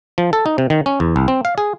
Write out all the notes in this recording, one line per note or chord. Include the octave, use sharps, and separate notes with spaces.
F3
A4
D#4
C3
D#3
C#4
E2
C2
C4
F5
G#4